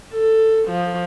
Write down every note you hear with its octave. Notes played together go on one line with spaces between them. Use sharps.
A4
F3